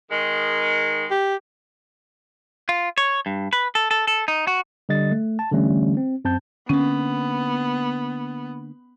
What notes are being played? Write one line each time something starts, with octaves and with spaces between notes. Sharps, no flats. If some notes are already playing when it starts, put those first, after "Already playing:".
D#3 G#3
G4
F4
C#5
G2
B4
A4
A4
A4
D#4
F#4
D3 G3 D#5 A6
A3
A5
D3 E3 G3 A3 C#4
C4
F#2 C4 A5 G6
D3 A#3 B3 C#4